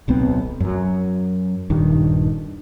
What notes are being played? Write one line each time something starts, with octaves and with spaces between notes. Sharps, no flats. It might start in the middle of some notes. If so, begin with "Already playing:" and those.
D1 B1 B3 C4
F#2 F#3
D#1 G2 D#3